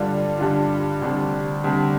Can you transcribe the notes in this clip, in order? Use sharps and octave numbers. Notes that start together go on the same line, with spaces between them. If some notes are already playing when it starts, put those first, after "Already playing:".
Already playing: G2 D3 G3 D4 F4
G2 D3 G3 D4 F4
D2 C3 G3 D4
D2 C3 G3 D4